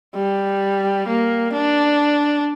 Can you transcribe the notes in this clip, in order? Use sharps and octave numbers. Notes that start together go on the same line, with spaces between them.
G3
A#3
D4